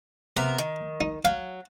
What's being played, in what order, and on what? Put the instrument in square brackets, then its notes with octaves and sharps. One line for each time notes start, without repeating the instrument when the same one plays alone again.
[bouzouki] C3 B3 A#4 [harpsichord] A#5
[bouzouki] D#3
[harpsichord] D#4
[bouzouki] F#3 [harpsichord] F5